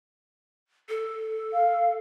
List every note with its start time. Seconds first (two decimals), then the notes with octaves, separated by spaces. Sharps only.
0.89 A4
1.53 F5